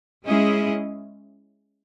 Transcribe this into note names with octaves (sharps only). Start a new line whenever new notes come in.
G#3 C#4 E4 G#4 D#5